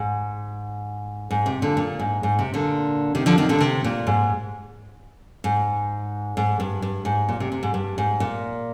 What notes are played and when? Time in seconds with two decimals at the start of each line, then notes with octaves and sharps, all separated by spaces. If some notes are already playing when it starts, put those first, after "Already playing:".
Already playing: G#2
1.31 G#2
1.46 C3
1.62 A#2 D3
1.77 A#2
1.99 G#2
2.23 G#2
2.39 C3
2.54 A#2 D3
3.15 C3 D#3
3.26 D3 F3
3.38 C3 D#3
3.49 A#2 D3
3.60 C3
3.84 A#2
4.07 G#2
5.44 G#2
6.37 G#2
6.60 G2
6.82 G2
7.05 G#2
7.29 A#2
7.40 C3
7.52 C3
7.63 G#2
7.74 G2
7.98 G#2
8.20 A#2